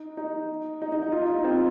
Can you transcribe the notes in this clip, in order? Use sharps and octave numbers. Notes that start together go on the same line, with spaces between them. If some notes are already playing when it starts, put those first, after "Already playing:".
Already playing: D#4
D#4
D#4
D#4
D#4
F4
D#4
D#4
C4 F4